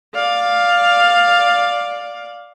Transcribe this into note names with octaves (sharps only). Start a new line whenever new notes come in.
D5 F5